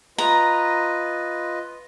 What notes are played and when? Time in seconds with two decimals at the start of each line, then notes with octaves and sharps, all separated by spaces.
0.18 F4 B4 D#5 A#5